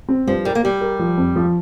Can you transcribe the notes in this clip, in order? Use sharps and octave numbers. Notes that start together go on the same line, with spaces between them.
C4
G2 F3
G3 A#4
A#3
G3 G4
A#4
F3
F2
F3